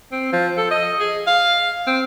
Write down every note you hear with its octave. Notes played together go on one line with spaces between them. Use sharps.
C4
F3
A4
D#5
G#4
F5
C4